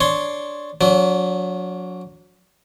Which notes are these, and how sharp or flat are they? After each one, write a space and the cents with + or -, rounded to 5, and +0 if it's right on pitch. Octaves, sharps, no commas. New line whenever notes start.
D4 +0 C#5 +0 C6 +0
F#3 -25 D4 -45